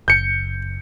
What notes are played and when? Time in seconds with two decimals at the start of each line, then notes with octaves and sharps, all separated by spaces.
0.08 F#1 G6 C#7